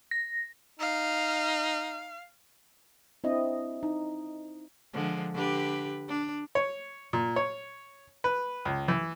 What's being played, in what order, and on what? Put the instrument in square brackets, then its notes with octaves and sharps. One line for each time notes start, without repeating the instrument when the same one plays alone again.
[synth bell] A#6
[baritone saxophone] D#4 [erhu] F5
[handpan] C4 D4 E4 D#5
D#4
[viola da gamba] D3 F3 G#3
D3 G4 B4
D4
[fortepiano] C#5
A#2
C#5
B4
C#2
E3